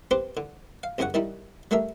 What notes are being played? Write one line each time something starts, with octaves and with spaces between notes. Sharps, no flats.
C4 G4 B4 C5
D3
F5
C2 F#2 C#3 C#4 C#5 F#5
D#3 G3 D#4 E4
G3 A3 D4 A#4 E5